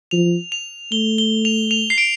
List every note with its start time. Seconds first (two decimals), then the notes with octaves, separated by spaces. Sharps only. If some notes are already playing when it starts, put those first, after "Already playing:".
0.11 F3 F7
0.52 F7
0.92 A3 G7
1.18 G7
1.45 F7
1.71 F7
1.90 C7
1.98 D7